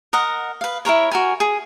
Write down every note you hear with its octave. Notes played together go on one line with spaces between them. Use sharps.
A#4 D#5 F#5
B4 F5
E4 A4 A#4 C#5
F#4 A#4 G#5
G#4